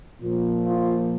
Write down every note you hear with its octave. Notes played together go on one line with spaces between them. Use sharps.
A#2 F3
F4